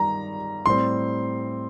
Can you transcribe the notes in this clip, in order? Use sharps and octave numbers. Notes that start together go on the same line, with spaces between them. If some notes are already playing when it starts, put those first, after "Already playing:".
Already playing: G2 D#3 G3 A#5
A2 G3 C4 C6